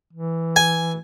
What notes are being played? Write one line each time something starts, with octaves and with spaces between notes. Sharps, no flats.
E3
G#5